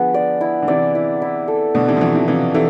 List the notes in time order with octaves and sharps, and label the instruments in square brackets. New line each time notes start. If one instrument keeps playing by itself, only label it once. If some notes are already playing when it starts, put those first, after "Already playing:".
Already playing: [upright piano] D3 F3 [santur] B3 G#4
[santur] D5
E4
[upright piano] D3
[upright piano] C3 E3 [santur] D5
[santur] E4
E4
A4
[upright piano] B2 D3 [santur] D5
[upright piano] C3 E3
F3
[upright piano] C3 E3 [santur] E4
[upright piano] C3 E3
[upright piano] C3 E3 [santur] F5
[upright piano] C3 E3 [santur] A4